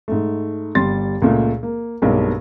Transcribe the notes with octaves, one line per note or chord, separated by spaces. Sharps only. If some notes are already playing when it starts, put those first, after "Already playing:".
G#2 A3
G1 G3 C6 A6
C#2 A#2 A3
A#3
B1 G2 B2 G#3 A#3